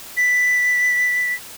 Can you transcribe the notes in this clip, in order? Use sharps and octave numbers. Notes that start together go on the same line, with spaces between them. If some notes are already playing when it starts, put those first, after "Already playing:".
B6